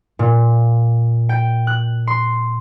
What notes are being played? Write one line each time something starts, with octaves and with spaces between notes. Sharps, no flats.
A#2
G5
F#6
C6